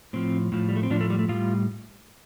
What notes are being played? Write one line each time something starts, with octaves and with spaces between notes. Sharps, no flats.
A2 F3 C4
A2 F3
G3
A3
C4
A2 F3 D4
A3
G3
A3
A2 G3 F4